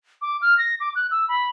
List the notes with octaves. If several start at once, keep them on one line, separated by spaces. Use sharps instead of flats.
D6
F6
A#6
D6
F#6
E6
B5